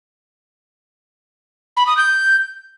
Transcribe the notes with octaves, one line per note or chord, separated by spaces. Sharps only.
B5
D#6
G6